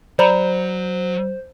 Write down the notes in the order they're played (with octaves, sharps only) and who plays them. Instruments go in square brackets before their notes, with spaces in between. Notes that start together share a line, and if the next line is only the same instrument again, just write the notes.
[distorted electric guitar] F#3 [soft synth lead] C5 [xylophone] D5 A#5 B5